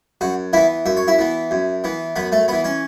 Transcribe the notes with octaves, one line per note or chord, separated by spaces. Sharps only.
F#2 F#4
E3 B3 E4 E5
F#2 E5
C#5
E4 E5
E3 B3
F#2
E3 B3
F#2 B3 B4
A3 A4
E3 B3 B4
C#4 C#5